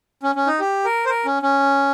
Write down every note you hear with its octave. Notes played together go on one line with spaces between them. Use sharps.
C#4
C#4
D#4
G4
A#4
C5
A#4
C#4
C#4